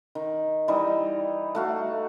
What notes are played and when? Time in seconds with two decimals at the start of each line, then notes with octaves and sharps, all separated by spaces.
0.15 D#3
0.68 E3 G3 D#4
1.55 A3 F#4 F5